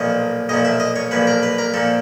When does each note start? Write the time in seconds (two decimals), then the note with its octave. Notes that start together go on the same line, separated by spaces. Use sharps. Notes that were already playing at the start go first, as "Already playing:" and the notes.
Already playing: B1 A#2 F3 D#5
0.49 B1 A#2 F3 D#5
0.65 E5
0.80 D#5
0.96 C#5
1.11 B1 A#2 F3 B4
1.27 A#4
1.43 B4
1.58 A#4
1.74 A#2 F3 A4